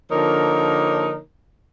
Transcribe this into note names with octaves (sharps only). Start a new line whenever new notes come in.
D3 F3 A#3 D#4 A#4 C#5